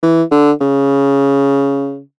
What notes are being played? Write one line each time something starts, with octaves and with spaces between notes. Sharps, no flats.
E3
D3
C#3